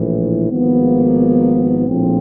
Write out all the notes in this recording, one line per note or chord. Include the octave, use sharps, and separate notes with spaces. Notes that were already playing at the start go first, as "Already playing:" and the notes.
Already playing: A#1 A2 E3
G#1 G#2 F3 A#3 B3
A#1 A2 F3 C4